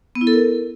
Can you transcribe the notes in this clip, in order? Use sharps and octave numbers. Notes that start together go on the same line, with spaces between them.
B3
E4
A4
A#4